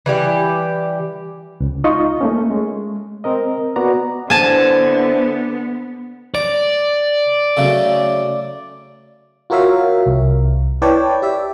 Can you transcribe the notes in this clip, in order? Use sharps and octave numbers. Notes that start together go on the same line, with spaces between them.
E3 G3 G4
C#2
D#4 F4 D#5 C#6
A3 A#3 C#4
G#3
C4 A#4 D#5
B3 F#4 D5 A#5
D3 B3 E4 C5 G#5 A5
D5 A#5
C#3 F#3 A3
F4 F#4 A#4 C#5 E5 F5
C2
E4 B4 C#5 D5 G5 A5
G4 D5 E5